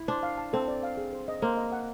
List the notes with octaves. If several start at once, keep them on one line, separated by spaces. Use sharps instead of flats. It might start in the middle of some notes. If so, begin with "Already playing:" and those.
Already playing: E4
D4 C5
F5
A5
C4 A4
D5
F5
G#4
C5
D#5
A#3 C5
D#5
F#5